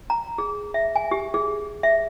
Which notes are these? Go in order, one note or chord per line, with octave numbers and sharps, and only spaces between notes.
A#5
G#4
E5
G#5
G4
G#4
E5